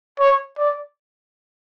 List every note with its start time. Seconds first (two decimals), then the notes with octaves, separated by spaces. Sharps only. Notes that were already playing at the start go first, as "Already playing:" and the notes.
0.19 C#5
0.58 D5